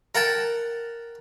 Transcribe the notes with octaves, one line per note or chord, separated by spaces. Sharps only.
A#4 F#5 G5 A5